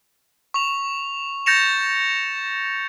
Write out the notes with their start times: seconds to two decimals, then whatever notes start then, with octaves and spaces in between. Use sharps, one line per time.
0.54 C#6 F7
1.46 G6 A6 A#6 C#7 E7 F7